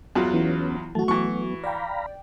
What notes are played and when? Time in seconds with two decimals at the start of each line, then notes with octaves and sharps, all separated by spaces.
0.15 E2 F#3 F4 F#6
0.34 E3 B3 C#4
0.95 E3 F#3 A3 F#4 A5
1.08 E3 F#3 B3 C#6
1.64 D5 F5 G5 A#5 B5